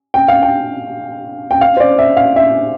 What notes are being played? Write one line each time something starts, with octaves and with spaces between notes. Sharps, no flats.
G5
F5
G5
G5
F5
C5
D5
E5
F5
E5